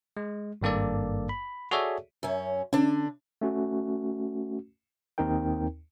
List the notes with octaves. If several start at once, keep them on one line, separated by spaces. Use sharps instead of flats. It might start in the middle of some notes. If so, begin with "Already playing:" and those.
G#3
G#1 G2 A#3 A4 D5
B5
F#4 G#4 A4 C#5 D5 E5
F#2 C#4
D3 C#4 D4
A3 C#4 F#4
D#2 C4 D#4 A#4 G5